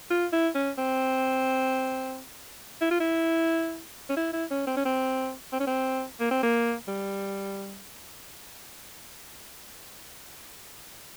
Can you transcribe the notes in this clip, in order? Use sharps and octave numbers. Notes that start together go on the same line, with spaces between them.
F4
E4
C#4
C4
E4
F4
E4
C#4
E4
E4
C#4
C4
C#4
C4
C4
C#4
C4
A#3
C4
A#3
G3